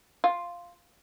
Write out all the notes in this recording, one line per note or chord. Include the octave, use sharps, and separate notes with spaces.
F4